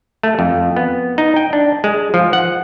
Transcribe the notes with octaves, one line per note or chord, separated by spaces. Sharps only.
A3
F2
B3
D#4
G5
D4
G#3
F3
F#5